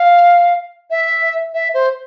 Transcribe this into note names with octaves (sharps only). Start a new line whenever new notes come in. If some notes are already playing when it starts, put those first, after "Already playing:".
Already playing: F5
E5
E5
C5